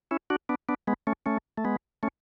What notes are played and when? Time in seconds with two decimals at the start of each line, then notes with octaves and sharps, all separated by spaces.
0.11 C#4 E4
0.30 D4 F#4
0.49 B3 D4
0.69 B3 D4
0.87 G#3 B3
1.07 A3 C#4
1.26 A3 C#4
1.58 A3
1.64 G#3 B3
2.03 A3 C#4